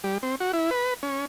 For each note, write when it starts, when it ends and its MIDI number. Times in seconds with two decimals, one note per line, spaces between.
0.04 0.18 55
0.23 0.35 60
0.40 0.52 66
0.53 0.70 64
0.71 0.94 71
1.03 1.25 61